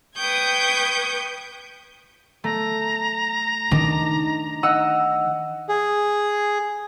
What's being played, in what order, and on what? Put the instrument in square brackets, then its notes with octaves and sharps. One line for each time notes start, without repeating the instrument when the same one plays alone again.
[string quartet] B4 G5 C#6 D#6 G6 G#6
[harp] A3 [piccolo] A#5
[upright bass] D#3 [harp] D4 D#4
[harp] D#5 F#5 E6
[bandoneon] G#4